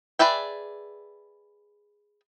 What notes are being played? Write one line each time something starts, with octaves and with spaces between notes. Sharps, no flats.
G#4 B4 D5 E5 G5